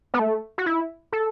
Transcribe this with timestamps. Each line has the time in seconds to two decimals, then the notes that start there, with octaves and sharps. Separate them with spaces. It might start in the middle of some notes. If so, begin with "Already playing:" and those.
0.14 B3
0.19 A3
0.58 F#4
0.66 E4
1.13 A4